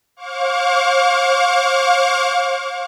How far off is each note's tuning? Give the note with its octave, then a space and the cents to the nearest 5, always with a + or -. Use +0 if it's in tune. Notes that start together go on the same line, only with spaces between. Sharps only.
C5 +45 F5 +30 D6 -45